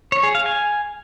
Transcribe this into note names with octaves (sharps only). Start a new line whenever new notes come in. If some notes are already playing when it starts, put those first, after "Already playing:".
C#5
G#4
F5
G#5